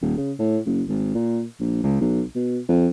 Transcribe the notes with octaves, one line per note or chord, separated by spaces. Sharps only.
D#1
C#3
A2
F#1
G#1
A#2
A#1
C#2
B1
B2
F2